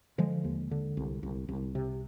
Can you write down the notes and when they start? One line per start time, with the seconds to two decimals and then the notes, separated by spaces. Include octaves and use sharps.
0.18 D3 F3 G#3
0.44 D#2
0.71 D3
0.97 C2
1.23 C2
1.49 C2
1.75 C3